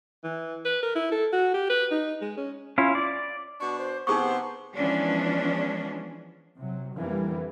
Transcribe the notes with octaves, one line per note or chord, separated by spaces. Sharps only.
E3
B4
A#4
E4
A4
F#4
G4
B4
D#4
G#3
C#4
C#4 E4 F4
D5
B2 D4 C#6
C5
C3 B3 D#4 G#4 C5 C#6
E3 F3 G#3 B3 C#4 D4
C3 F#3
F2 D3 E3 G3 A#3